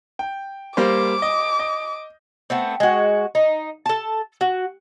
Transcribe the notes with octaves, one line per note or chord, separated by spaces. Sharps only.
G5
G3 A#3 C5 D6
D#5
D#5
A3 B3 C4
G#3 F#4
D#4
A4 A5
F#4